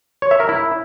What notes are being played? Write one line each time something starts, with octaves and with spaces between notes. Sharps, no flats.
C#5
E5
A#4
E4